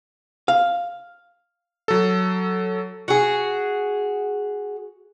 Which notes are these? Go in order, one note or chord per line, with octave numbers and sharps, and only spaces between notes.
F5
F#3 A4
F#4 G#4